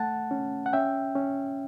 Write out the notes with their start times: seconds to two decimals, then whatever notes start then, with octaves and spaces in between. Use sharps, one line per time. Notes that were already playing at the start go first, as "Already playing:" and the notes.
Already playing: A3 F#5 A5
0.31 C#4
0.66 F#5
0.73 C#4 E5 G5
1.16 C#4